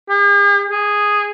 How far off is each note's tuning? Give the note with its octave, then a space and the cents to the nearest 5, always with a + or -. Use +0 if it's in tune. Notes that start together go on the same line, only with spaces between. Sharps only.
G#4 -45
G#4 -5